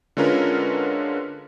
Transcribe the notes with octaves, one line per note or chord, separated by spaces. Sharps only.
D3 G#3 C#4 F4 A#4 B4